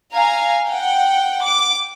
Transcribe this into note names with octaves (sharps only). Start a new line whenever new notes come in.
F5 G#5 A#5
F#5 G5
D6